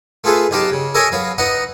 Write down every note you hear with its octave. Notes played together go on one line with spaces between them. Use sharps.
A3 F4 G#4 A4 B4
B1 D#4 G4 F5 A5
C#3
A4 A#4 C#5 D#5 E5 G#5
F#3 B3 F5
B3 D#4 D#5 F#5